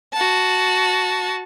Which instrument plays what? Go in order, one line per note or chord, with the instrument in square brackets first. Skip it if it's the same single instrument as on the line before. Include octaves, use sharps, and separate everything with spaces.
[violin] F#4 A5